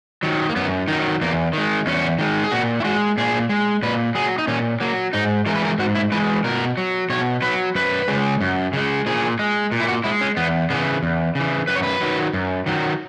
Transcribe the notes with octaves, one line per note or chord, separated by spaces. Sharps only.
D#3 F#3
A#3
F#2 B3
D#3 F#3 D#4
E2 A#3
D#3 G#3
E2 C#4
D#3 G#3
G#4
A#2 F#4
E4
G#3 F#4
A#2 G#4
G#3
A#2 B4
F#3 G#4
D#4
A#2 C#4
F#3 A#3
G#2 D#4
E3 G#3 A#4
B4
A#4
G#2 F#4
E4
E3 G#3 B4
B2 A#4
F#3
B2 C#5
F#3 B4
F#2 B4
C#3 G#3
F#2
C#3 G#3
A#2 G#4
G#3
A#2
E4
F#4
G#3 E4
C#4
E2 B3
C#3 E3 B3
E2
C#3 E3
F#2 B4
C#5
B4
D#3 F#3
F#2
D#3 F#3